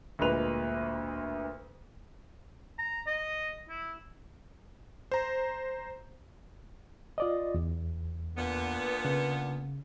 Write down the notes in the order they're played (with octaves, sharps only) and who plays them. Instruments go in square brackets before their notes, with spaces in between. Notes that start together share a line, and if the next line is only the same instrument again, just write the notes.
[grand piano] D2 A#2 G#3 A#3 B4 F7
[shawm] A#5
D#5
E4
[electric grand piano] C5 A#5
[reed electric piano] F4 D5 D#5
E2
[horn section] A#2 D3 B3
[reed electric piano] C#3